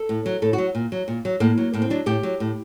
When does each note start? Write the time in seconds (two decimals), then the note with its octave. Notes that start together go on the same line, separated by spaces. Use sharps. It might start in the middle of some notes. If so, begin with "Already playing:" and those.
Already playing: A4
0.09 A2
0.26 F#3
0.42 A2 A4
0.53 F#4
0.58 F#3
0.75 A#2
0.92 F#3
1.08 A#2
1.25 F#3
1.40 A2 A#3
1.58 F#3
1.74 A2 A#3
1.82 C4
1.90 F#3 D4
2.06 A2 G4
2.23 F#3
2.40 A2